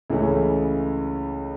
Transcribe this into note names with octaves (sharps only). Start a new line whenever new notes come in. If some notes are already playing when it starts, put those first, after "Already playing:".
C#2 C#3 E3 A3 C#4